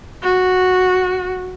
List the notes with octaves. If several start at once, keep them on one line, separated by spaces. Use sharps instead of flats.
F#4